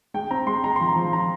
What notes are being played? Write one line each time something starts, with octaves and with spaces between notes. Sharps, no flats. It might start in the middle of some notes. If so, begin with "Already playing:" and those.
G#3 G5
C4 A#5
G#3 C6
G#3 A#5
C6
F3
A#5
F3
F3 A#5